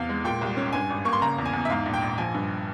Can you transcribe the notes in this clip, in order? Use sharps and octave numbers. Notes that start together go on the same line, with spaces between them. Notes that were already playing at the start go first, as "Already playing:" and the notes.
Already playing: E2 C3 F5
G#3
A#2 G5
C2
C#4
G2 G#5
G#1
A#3 C#6
C6
C#3 A#5
E2
G#5
E2
E5
G#2 F5
A#1
G5
A#1
F3 G#5
G2